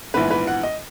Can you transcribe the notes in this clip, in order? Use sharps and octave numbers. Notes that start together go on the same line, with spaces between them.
A#1 G#2 E3 B3 B4
B4
F#5
D#5